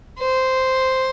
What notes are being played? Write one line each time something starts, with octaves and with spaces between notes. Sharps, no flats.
C5